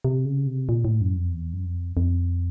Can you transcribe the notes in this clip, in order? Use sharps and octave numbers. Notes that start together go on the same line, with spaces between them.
C3
C#3
C3
A#2
A2
F#2
F2
E2
F#2
F2
F2